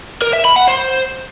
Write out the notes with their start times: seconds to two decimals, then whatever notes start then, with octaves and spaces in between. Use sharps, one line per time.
0.22 A#4
0.33 E5
0.45 B5
0.56 F#5
0.68 C5